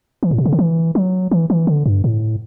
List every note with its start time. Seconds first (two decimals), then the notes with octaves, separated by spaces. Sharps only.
0.23 E3
0.31 A2
0.38 B2
0.46 C#3
0.53 D3
0.59 E3
0.95 F#3
1.31 E3
1.50 E3
1.67 D3
1.86 G2
2.04 A2